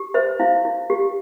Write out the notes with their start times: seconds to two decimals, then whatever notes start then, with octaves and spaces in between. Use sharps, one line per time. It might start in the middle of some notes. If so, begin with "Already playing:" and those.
Already playing: G4
0.14 C5 E5
0.40 E4 F5
0.65 E4
0.90 G4